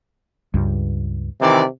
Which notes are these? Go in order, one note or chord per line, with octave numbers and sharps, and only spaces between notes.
C#2 G2
C3 D#3 E3 D5